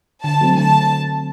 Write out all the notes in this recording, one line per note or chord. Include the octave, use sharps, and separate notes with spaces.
D3 A5
F#3 A3 C4
D3 A5